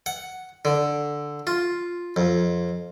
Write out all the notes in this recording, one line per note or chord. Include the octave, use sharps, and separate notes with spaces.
F#5
D3
F4
F2